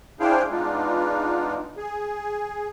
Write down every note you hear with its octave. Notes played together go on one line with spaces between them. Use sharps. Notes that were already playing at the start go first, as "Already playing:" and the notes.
D4 E4 G#4 C5 F5 G5
G#3 B3 D4 D#4 F4
G#4